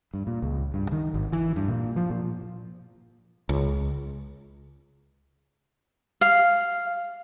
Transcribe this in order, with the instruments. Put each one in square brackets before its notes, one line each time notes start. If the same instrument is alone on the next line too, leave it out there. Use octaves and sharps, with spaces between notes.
[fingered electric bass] G2
A#2
C#2
G2
D#3
G#1
E3
G2
A#2
F3
A#2
[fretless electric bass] C#2
[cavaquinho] F5